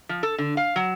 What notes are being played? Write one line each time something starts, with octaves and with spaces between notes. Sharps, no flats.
F3
A4
D3
F5
F#3